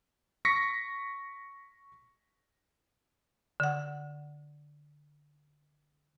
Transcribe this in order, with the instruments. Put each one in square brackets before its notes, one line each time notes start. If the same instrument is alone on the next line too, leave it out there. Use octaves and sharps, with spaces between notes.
[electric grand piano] C#6 A#6 B6 C#7
[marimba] D3 F#5